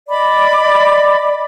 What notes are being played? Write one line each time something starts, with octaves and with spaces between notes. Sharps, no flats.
D5 D#5 B5 D6